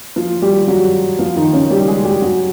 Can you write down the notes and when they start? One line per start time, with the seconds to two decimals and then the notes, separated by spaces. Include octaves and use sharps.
0.16 F3 F4
0.42 G3 G4
0.67 F#3 F#4
1.19 F3 F4
1.36 D#3 D#4
1.53 C#3 C#4
1.70 G3 G4
1.87 G#3 G#4
2.05 G3 G4
2.22 F#3 F#4